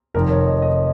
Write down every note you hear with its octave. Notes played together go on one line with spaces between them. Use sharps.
F1 F2 D#3 A#4
C#5
D#5
D#5